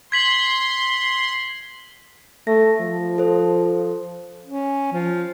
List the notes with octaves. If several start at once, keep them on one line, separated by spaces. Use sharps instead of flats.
C6 G#6 B6 F#7
A3 A#6
F3
A4 C5
C#4
F3